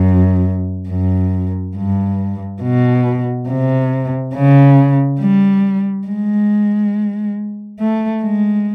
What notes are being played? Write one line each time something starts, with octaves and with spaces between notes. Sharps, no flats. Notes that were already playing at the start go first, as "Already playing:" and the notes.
Already playing: F#2
F#2
G2
B2
C3
C#3
G3
G#3
A3
G#3